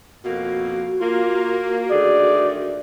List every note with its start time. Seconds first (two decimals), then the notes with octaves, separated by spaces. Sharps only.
0.24 F2 B2 A#3 F#4
1.00 A#3 F4
1.91 D3 D#3 A3 G#4 D5